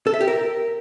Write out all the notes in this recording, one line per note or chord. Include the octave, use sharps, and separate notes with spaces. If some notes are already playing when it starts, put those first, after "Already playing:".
A4
E5
G4
A#4